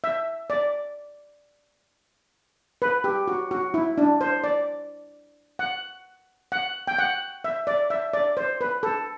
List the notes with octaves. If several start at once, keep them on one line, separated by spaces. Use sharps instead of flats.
E5
D5
B4
G4
F#4
F#4
E4
D4
C5
D5
F#5
F#5
G5
F#5
E5
D5
E5
D5
C5
B4
A4